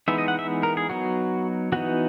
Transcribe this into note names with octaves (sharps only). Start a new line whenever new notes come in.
E3 G#3 B3 D#4 E5
D#5
F#5
E5
A#4
G#4
F#3 B3 D#4 F#4
E3 B3 D#4 F#4